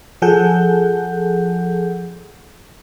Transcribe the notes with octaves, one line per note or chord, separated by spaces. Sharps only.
F3 G#4 A4 F#5 G6